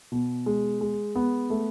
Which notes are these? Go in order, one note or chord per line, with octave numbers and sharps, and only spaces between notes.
B2
G#3
G#3
B3
A3